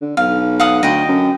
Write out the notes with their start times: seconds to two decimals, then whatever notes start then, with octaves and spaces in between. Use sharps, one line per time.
0.02 D3
0.17 B1 F5
0.60 F5 F#5 D#6
0.83 D2 D#5 G5
1.08 F#2